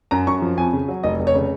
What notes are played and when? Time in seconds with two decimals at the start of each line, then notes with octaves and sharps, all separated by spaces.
0.11 F#2 A#5
0.27 F#2 C#6
0.42 F3
0.58 F2 G#5
0.73 C#3
0.88 F#3
1.04 F1 D#5
1.20 F1
1.27 C#5
1.35 C#3